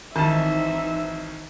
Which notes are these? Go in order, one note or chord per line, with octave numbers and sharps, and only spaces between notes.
G#1 D#3 E3 C4 D#4 E5 A5